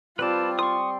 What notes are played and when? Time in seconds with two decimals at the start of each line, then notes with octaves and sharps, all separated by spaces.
0.19 G3 C4 F4 B4 D5 A5
0.59 C6 C#6 D#6